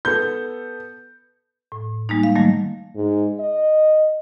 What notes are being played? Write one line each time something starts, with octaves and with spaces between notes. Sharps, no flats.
B3 A4 G6
A2
G3 G#3 A#3 D#4
F5
D#3 F#3 G3 A3 A#3
G#2
D#5